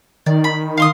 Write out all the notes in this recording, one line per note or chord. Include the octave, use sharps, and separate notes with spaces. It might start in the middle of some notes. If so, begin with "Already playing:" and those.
D#3 D5
B5
F5 C6 D#6